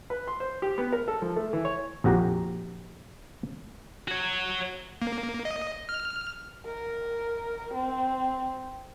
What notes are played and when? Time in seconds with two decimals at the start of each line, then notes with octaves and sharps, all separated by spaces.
0.10 B4
0.28 C6
0.40 C5
0.62 G4
0.78 B3
0.92 A#4
1.08 A4
1.22 F3
1.36 A3
1.53 E3
1.65 C#5
2.04 A#1 F2 F#4 G4 A#5
4.08 F#4 C#5
5.02 A#3
5.45 D#5
5.89 F6
6.66 A#4
7.73 C4